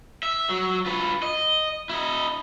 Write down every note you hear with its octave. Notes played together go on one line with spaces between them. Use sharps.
E5
F#3
F4 B4
D#5
E4 D#5